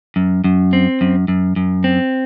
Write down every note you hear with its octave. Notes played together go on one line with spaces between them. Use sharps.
F#2
F#2
C4
F#2
F#2
F#2
C4